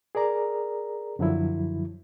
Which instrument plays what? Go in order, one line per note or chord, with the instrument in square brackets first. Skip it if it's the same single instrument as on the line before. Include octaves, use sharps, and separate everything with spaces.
[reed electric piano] G#4 A#4 D5 A#5
F#2 D3 F3 F#3 E4